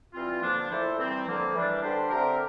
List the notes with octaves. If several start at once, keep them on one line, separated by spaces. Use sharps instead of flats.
E3 G3 C4 F4
G2 D3 F3 A#3 D4
A#2 A3 E4 A4 C5
C3 E3 G3 C4
D3 F3 A#3
E3 G3 D4
D3 G3 D4 G4 C5
D3 A3 C4 G4 A#4